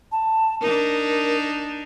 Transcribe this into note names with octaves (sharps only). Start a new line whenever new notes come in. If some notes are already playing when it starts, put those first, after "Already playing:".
A5
D4 D#4 A#4